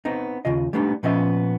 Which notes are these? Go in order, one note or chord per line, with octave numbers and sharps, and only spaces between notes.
B3 C4 D#4
D#2 C#3 F4 D#5
G3 A3 B3 D4 D#4
A#2 F3 B3 C#4 D#5 E5